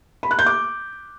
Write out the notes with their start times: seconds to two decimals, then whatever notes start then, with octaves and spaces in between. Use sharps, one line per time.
0.23 B5
0.31 F#6
0.39 G6
0.46 D6